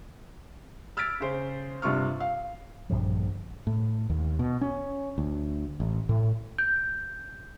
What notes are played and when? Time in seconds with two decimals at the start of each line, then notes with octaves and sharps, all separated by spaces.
0.97 E6 F6 G#6 A6 B6 D7
1.20 C#3 C5
1.82 G2 C3 F4 C#6 F6
2.20 F5
2.90 A#1 G2 D3 F3
3.67 A2
4.10 D#2
4.39 B2
4.61 C#4
5.18 D2
5.80 A1
6.09 A2
6.58 G6